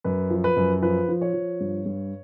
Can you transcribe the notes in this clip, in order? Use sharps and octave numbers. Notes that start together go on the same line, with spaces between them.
F#2 B4
F3
B4
F#2
F3 B4
F3
C#5
F3
G2
G2